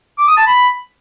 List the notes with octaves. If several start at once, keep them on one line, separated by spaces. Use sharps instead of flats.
D6
D#6
A5
B5